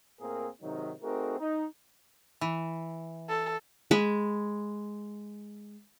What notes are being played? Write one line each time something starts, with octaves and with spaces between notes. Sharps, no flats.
A2 A#3 C4 G#4 A#4
G#2 C3 D#3 F#3 D#4
A3 C4 D#4 F#4 G#4 A#4
D#4
E3
A4
G#3 B5